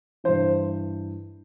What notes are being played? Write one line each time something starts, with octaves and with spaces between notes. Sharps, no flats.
G2 E3 C5